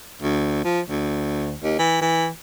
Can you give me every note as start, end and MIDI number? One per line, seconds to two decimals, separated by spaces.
0.22 0.60 38
0.64 0.81 53
0.89 1.54 38
1.63 1.75 39
1.79 2.00 52
2.01 2.28 52